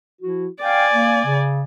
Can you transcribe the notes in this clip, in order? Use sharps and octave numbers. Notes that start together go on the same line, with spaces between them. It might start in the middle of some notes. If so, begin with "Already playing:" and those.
F3 E4 F#4
D5 F5 G5 G#5
A#3
C#3